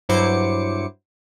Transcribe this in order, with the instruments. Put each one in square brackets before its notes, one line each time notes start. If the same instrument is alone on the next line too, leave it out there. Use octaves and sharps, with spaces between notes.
[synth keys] G2 F#3 E4 C5 D6 C#7